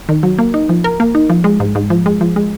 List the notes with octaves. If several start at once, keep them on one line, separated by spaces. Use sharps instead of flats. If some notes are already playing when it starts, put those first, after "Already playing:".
D#3
F#3
A#3
D#4
F3
A#4
A#3
D#4
F3
G#3
G#2
G#2
F3
G#3
F3
G#3